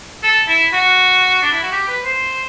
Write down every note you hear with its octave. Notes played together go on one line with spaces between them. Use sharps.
A4
E4
F#4
D4
E4
F#4
G4
B4
C5